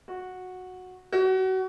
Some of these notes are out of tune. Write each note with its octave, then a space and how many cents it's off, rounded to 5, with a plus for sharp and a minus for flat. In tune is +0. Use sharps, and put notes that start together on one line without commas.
F#4 -10
F#4 +30